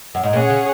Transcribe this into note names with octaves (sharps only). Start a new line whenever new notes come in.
F#2
G#2
A#2 C#4 G#4 C#5 F#5
C#3